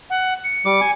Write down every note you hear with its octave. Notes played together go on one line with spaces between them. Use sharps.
F#5
C#7
G3 D6
G#5